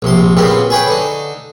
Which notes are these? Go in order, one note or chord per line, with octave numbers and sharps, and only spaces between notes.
A#1 C3 C6
A#2 C#3 B3 C4 G4
G#4 B4 C#5 G5
D3 D#4